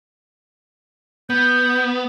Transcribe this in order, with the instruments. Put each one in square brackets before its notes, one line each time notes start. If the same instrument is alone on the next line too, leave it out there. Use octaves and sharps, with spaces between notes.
[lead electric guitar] B3 [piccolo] G6